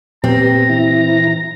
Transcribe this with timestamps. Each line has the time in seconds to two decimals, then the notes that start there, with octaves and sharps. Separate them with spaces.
0.24 A#2 B3 C4 G4 A#5
0.69 E3 E4 A#6